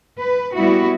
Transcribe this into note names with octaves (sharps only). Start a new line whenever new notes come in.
B4
G3 B3 E4 F#4